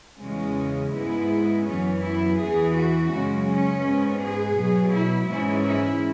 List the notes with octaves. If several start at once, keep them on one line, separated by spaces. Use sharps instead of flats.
E2 C#3 G#3 C#4
G#2 G#3 B3 E4
F#2 E3 B3 C#4
E4
E2 E3 B3 G#4
F#4
F#2 C#3 G#3 C#4
C#4
G#2 G#3 B3
G#4
B2 F#3 B3
E4
G#2 E3 G#3 C#4 E4
E4